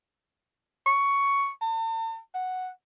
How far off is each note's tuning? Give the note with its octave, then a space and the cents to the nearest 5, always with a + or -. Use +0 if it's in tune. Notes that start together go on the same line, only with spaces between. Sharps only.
C#6 +10
A5 +45
F#5 +0